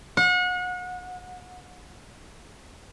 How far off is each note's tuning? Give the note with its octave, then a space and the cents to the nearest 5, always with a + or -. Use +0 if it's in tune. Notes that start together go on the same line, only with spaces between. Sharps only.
F#5 -35